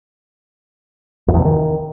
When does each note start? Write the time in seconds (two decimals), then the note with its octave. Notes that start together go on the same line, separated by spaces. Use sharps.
1.28 F2
1.34 E2
1.39 B2
1.45 D#3